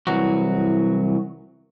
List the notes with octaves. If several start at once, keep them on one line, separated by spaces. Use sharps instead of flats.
C2 E3 F#3 F#4